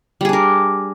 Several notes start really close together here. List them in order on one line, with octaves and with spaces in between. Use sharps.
G3 G#4 D4 A#4